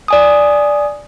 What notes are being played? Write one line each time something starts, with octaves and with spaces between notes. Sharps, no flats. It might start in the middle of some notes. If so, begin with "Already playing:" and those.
D5 G#5 D#6